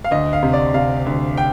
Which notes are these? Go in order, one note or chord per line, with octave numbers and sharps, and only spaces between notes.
F5
D2 D#5
F5
C3
D5
C3 F5
D2
G5